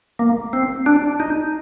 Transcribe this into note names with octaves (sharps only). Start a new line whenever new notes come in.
A#3
C4
D4
D#4